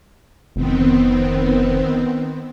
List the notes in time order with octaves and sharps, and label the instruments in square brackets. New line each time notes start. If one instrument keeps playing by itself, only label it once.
[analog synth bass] F1 [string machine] D#3 B3 C4